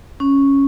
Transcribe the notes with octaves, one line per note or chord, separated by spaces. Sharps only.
C#4